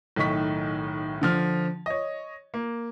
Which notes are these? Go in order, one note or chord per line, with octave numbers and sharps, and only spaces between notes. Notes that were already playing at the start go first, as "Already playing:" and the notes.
B1 A2 D#3 C#6 B6
D3 F3 F6
C#5 D#5
A#3